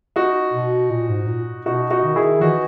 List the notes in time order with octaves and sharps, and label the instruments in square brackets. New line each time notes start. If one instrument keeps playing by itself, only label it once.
[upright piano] D#4 F#4
[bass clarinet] B2
A#2
G#2
A#2
[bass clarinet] B2 [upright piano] D#4 F#4
[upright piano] D#4 F#4
[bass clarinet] D#3
[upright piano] E4 G#4
[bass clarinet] E3 [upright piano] D#4 F#4